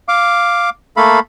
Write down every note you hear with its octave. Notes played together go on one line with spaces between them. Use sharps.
F5 D6
A3 A#3 A4 F5 B5